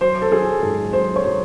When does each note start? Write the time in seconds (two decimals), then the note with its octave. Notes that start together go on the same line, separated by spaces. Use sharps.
0.01 F#3 C5
0.22 A4
0.32 F#3 G#4
0.62 G#2 A4
0.92 F#3 C5
1.16 C#5
1.23 F#3